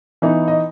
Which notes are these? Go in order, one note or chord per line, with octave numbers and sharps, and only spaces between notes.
E3 B3 D#4
D#5